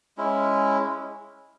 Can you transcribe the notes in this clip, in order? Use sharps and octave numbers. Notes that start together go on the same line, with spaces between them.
G#3 C#4 E4